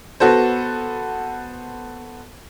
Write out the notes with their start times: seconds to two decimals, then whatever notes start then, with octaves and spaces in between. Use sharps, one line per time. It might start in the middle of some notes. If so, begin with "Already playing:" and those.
0.20 B3 F#4 A4 C5